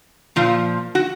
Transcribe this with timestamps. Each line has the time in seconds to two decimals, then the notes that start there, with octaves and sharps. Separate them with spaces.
0.36 A#2 F3
0.95 F#4